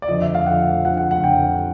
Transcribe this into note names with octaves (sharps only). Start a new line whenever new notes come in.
D5
F2 D3 F3 D#5
E5
F5
F2 D3 F3 F#5
F2 D3 F3 F#5
F#5
F#5
F2 D3 F3 G5